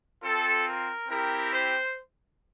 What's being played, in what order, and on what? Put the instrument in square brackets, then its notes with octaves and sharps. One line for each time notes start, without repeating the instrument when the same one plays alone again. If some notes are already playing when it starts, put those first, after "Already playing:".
[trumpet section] C4 F4 A4
A#4
C4 E4 G4 A#4
C5